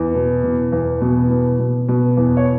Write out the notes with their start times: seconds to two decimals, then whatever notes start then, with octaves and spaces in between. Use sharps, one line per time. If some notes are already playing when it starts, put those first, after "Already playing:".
Already playing: E2
0.15 B2
0.44 B2
0.72 E2
1.01 B2
1.31 B2
1.59 B2
1.89 B2
2.17 E2
2.37 C#5